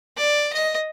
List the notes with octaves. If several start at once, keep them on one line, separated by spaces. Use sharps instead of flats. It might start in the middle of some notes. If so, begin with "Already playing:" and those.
D5
D#5